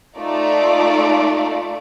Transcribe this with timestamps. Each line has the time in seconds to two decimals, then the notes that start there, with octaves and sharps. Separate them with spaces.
0.18 A3 D#4 F4 D5